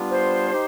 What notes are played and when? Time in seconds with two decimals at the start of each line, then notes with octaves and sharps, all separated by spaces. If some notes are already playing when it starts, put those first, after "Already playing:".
Already playing: G3 B3 D4 F4
0.10 C5
0.52 D#4 G4